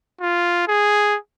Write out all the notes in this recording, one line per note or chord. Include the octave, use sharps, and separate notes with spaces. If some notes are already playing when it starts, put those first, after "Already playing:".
F4
G#4